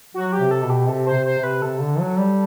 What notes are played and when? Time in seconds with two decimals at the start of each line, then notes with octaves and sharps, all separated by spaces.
0.14 F#3 F#4
0.32 G4
0.39 C3
0.51 A4
0.64 B2
0.70 G4
0.88 C3 A4
1.07 C5
1.13 C3
1.26 C5
1.38 C3 B4
1.62 C3 A4
1.81 D3
2.00 F#3
2.18 G3